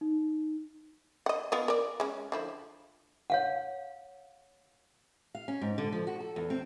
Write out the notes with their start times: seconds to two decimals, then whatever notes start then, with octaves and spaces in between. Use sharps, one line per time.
0.01 D#4
1.26 D#5 F#5
1.52 B3 F4 D#5
1.68 A#4 D5
2.00 G#3 C#4
2.32 D3 F3 E4
3.30 C#5 F5 F#5
5.35 F5
5.48 C#4
5.61 G#2
5.78 D3
5.92 F3
6.07 F#4
6.20 A4
6.36 E2
6.50 C4